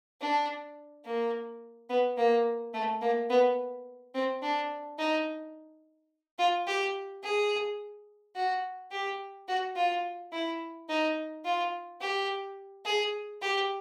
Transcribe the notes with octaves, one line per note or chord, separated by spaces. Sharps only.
D4
A#3
B3
A#3
A3
A#3
B3
C4
D4
D#4
F4
G4
G#4
F#4
G4
F#4
F4
E4
D#4
F4
G4
G#4
G4